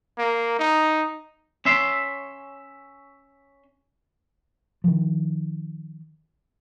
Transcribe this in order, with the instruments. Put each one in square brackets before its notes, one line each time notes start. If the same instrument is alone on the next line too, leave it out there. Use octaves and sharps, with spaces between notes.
[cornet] A#3
D#4
[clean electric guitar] C#4 E5 C6
[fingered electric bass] D#3 F3